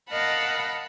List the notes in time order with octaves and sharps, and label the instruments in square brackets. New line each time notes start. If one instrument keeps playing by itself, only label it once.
[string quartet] A#4 D#5 F5 F#5 A5 B5